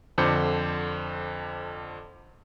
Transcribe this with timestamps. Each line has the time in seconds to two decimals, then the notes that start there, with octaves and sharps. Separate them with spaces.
0.18 F2 D3 C5 D6 G6 C#7